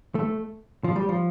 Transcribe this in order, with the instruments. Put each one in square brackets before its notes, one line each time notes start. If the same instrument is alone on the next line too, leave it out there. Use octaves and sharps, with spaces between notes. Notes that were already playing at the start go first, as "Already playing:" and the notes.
[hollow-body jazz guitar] A3
F3
G3
F3